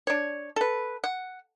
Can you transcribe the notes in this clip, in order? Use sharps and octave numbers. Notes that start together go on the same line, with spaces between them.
D4 C#5
A4 B4
F#5